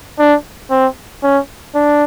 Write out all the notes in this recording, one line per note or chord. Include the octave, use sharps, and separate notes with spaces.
D4
C4
C#4
D4